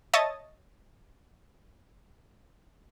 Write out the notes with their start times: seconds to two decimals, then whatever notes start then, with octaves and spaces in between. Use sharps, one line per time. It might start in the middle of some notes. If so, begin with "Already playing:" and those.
0.14 C#5 D#5 E5 A5 D#6 A6